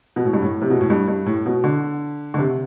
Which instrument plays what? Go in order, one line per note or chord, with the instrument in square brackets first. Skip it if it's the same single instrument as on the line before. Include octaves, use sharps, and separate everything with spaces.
[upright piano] B2
A2
G2
A2
C3
B2
A2
G2
G2
A2
B2
D3
D3
C3